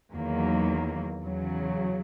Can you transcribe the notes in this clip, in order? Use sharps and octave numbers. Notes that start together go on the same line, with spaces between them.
E2 D#3 F#3 A#3
E2 C#3 F#3